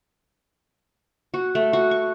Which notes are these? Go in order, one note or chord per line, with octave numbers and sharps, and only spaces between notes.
F#4
A3
F#4
C#6